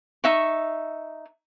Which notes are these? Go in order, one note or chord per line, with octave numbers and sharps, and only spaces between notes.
D#4 E5 C#6